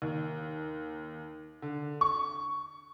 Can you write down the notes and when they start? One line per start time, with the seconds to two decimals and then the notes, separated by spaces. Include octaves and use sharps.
0.02 D#2
1.62 D3
2.01 C#6